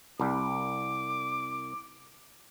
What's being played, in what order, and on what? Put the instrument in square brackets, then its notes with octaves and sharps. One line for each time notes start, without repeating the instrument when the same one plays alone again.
[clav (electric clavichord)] C2 G3 [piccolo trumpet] D6